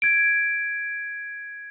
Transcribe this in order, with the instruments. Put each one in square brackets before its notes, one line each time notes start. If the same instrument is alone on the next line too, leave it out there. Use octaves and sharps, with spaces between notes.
[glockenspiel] G#6 D7